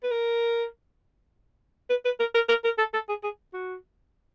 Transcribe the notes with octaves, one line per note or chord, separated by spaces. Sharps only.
B4
A#4
B4
B4
A#4
A#4
A#4
A#4
A4
A4
G#4
G#4
F#4